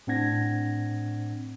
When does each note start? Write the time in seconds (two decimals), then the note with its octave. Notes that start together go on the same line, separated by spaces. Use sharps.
0.07 A2 C4 D4 F#5 G#6 A#6